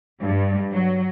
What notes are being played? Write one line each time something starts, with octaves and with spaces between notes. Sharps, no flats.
G2
F#3